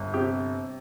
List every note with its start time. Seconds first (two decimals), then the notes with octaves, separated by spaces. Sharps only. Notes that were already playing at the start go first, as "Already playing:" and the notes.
Already playing: G1
0.14 C3 G4